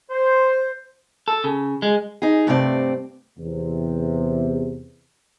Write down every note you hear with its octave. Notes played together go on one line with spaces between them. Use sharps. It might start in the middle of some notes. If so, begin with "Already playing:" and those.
C5
A4
C#3
G#3
D#4 G#4
G2 C3 A3 C4 D5
E2 C3